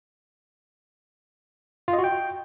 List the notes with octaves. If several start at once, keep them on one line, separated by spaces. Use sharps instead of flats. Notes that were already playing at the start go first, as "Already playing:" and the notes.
F4
D#5
F#4
G5